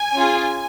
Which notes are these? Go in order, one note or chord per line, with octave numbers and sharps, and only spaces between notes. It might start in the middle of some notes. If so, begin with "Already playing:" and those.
Already playing: G#5
C#4 F4 G#4